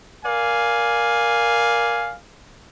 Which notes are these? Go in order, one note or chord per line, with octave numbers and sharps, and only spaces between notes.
A#4 D5 F5 G#5